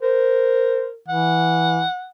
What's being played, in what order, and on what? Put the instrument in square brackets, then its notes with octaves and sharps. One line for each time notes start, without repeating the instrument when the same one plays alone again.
[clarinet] A#4 [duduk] C5
[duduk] E3 [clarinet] F#5